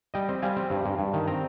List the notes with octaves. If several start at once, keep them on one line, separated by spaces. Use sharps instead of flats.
G3 D#5 G5
C4
G3 F5 G#5
C4
G2
G2
G2
D#3
C4 G5 A#5